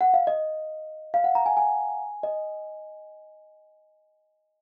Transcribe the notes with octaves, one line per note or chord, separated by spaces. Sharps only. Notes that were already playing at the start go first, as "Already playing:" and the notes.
F#5
F5
D#5
F5
F#5
A#5
G#5
G#5
D#5